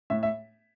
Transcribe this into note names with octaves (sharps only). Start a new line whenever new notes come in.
A2 E5
E5